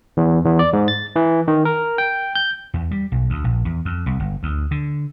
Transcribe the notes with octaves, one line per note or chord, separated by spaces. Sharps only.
E2
E2
D5
G#2
A6
E3
D#3
A#4
G5
G6
E2
G3
B1
D2
A#1
E2
F2
C2
G1
D2
D3